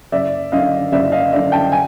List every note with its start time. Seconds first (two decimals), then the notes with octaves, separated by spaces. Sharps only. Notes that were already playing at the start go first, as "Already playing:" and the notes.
0.12 F#1 D5 E5
0.52 F#2 D3 D#5 F5
0.92 F#1 D5 E5
1.12 D#5 F5
1.32 F#2 D3 D5 E5
1.52 G5 A5
1.72 G#5